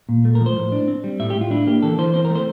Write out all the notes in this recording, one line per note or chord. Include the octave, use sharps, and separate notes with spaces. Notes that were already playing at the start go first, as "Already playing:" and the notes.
A#2
A3
A#4
F3
C5
A2
D4
C4
G3
A2 E5
G4
A2
F4
D4 E4
A#3 G4
E3 A4
E3 C5
C4 C5
A#4
A3
C5